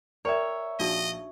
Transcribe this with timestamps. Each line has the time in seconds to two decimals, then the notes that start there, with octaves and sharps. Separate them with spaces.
0.25 A#4 C#5 D5 E5 G5 G#6
0.79 A#1 D4 D#4 F#4 D#5